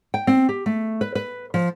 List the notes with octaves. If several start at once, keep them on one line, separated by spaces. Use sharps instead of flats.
G5
C4
G4
A3
B4
B4
F3